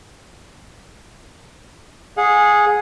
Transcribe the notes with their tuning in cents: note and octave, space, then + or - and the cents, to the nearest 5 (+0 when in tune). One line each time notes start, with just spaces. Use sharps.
G#4 +0 F#5 -40